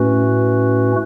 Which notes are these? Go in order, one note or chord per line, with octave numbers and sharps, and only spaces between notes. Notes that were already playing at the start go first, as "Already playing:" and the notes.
Already playing: A2 A3 C#4 F#4 B4